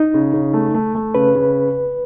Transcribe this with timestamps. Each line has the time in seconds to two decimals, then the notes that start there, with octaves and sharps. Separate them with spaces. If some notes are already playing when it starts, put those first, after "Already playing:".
Already playing: D#4
0.14 C#3
0.34 C#3
0.54 A3
0.74 A3
0.95 A3
1.15 C#3 B4
1.35 C#3